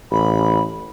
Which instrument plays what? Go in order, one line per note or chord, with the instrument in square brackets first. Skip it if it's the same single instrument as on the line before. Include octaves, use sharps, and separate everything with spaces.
[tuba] A1 [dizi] B5